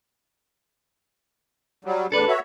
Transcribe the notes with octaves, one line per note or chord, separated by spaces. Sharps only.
F#3 G3
E2 A2 D4 A4 B4
F#4 C#5 E5